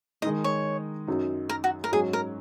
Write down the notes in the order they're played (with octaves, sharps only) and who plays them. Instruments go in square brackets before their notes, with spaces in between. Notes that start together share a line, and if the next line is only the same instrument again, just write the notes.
[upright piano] D#3 G#3 D#4 [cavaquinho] D#5
[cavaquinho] C#5
[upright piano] F#2 F#3 D#4
[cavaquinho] A#4
F#4
A#4
[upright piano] G#2 F#3 C#4 [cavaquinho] G#4
[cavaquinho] A#4